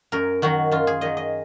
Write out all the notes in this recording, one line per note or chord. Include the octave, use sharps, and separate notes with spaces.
F#2 A#4
D#3 F#3 F#4
F#2 F4
G#4
D#3 F#3 D#5
D#5